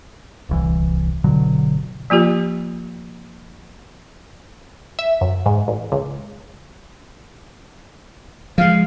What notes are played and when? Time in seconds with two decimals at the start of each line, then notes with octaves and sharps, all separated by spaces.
0.49 D1 C2 E3
1.24 G1 B2 D3 F#3
2.10 F3 A#3 F4 G4
4.99 E5
5.21 F#2
5.46 G#2
5.68 A1
5.92 C#2
8.58 F3 G#3 F5